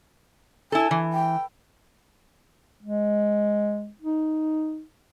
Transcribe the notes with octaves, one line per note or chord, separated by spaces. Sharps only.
E4 A4 G#5
E3
G5
G#3
D#4